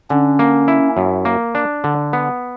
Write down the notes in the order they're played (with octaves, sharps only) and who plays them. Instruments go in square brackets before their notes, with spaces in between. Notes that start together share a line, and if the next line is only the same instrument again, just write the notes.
[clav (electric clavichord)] D3 [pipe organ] C#4
[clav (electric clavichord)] A#3
E4
F#2
A#3
D4
D3
B3